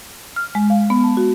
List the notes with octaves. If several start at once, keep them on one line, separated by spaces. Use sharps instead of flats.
F6
G#3
F5
B3
A5
F#4